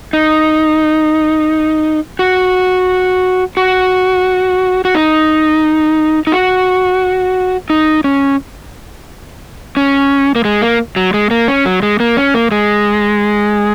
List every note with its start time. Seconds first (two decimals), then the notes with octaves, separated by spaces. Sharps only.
0.13 D#4
2.19 F#4
3.57 F#4
4.85 F#4
4.95 D#4
6.27 D#4
6.32 F#4
7.70 D#4
8.04 C#4
9.77 C#4
10.35 A#3
10.45 G#3
10.62 A#3
10.96 F#3
11.14 G#3
11.31 A#3
11.48 C#4
11.65 F#3
11.83 G#3
12.00 A#3
12.17 C#4
12.34 A#3
12.51 G#3